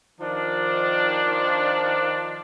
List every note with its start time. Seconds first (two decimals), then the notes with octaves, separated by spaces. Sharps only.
0.20 D#3 F3 D4